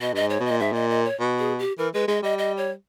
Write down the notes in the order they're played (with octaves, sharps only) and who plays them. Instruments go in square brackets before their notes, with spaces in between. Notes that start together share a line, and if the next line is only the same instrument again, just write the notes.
[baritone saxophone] B2 [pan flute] D#5
[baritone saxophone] G2 [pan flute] D#5
[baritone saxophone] G#2
[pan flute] C#5
[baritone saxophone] B2
[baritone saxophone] A#2 [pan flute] D#5
[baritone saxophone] G#2 [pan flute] E5
[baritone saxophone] A#2 [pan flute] D#5
[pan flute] D#5
C#5
[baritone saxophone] B2
[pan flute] G#4
G4
[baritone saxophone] E3 [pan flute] A#4
[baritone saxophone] G#3 [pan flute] B4
[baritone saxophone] G#3 [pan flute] D#5
[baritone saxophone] G3 [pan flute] D#5
[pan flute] D#5
C#5